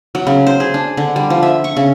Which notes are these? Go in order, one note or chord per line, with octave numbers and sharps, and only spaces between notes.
F#3
C#3
C5
G#4
D4
D3
G3
F3
E5
C#6
C#3